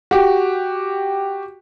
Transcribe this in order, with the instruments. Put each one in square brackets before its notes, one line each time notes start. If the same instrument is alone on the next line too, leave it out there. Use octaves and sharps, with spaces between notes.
[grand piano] F#4 G4